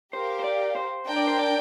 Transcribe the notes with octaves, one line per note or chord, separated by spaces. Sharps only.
G4 A#4 C5 F5
C5
D5
C5
D4 A#4 G5
D5
C5
D5